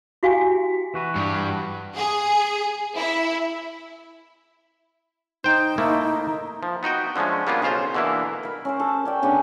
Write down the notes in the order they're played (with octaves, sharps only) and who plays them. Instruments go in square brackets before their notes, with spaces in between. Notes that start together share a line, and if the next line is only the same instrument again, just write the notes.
[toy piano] E4 F#4 G4 F5 G5 G#5
[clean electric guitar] E3 F#4 B4
[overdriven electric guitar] G2
[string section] G#4
E4
[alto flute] D#4 [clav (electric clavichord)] C5 G5
[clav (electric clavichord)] A3 A#3 E4
F3
B3 D#4 F#4 G5
D3 F3 G#3 A3 C#4
G3 A#3 B3 C#4 D4 F4
B1 C#3 F4 C5 A#5
B2 D3 E3 A#3 E4
[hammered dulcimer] A#4 B5
C#4 A#4 C5
A4
C#4 D5 G5
C#3 B3 D4